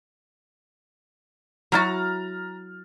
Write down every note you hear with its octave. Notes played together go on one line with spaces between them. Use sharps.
F#3 E4 F#4 A#5 F6 A6